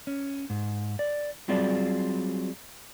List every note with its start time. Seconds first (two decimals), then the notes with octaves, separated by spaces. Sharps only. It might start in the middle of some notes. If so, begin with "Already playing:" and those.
0.07 C#4
0.50 G#2
0.99 D5
1.48 F#3 G3 C4 F4 G#4 D5